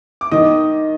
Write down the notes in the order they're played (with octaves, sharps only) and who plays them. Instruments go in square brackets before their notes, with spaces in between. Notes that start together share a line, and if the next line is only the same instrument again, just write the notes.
[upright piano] D6
[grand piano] D#3 [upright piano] D#5 D#6